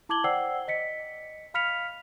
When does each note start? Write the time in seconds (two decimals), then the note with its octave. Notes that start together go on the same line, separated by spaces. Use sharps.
0.09 E4 A5 D6 G#6 F#7 G7
0.24 C5 D5 F#5 G5 E6 C7
0.68 D#5 B6 C#7
1.54 F5 B5 F6 B6 C#7 F7